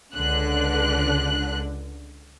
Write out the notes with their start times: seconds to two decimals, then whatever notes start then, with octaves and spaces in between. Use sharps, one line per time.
0.14 C#2 D3 F#6